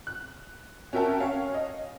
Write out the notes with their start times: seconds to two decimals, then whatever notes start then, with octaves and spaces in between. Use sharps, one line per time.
0.07 F#6
0.93 C#4 F#4 A#4 E5 G5 A5
1.20 C#4 C#5 F5
1.54 D#5